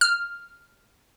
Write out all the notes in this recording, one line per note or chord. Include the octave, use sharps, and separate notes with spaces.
F6